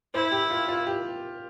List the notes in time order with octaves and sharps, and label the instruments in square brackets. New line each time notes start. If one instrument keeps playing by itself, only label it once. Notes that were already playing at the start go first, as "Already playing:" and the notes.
[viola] E4 [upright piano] C5
[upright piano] G4
F4
F4
G4